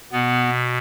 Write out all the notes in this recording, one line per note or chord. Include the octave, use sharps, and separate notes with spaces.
B2 B3